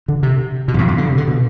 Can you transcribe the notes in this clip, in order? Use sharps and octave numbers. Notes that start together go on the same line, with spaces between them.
D3
C3
B2
F2
E2
F2
D3
C3
D3
B2